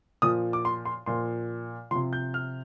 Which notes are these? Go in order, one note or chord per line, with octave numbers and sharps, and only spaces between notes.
A#2 F3 D#6
D6
C6
C6
A#2 F3 C6
C3 F3 C6
G6
F6